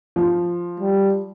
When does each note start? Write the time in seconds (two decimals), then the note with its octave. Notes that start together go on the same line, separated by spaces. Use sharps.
0.16 F3
0.80 G3